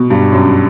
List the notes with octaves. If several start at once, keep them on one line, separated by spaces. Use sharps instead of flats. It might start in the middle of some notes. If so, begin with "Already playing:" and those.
Already playing: B2
G2
F#2